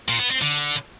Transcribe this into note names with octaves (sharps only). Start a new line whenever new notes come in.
A#2
B3
C4
D3